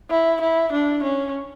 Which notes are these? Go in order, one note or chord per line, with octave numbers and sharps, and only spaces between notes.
E4
E4
D4
C#4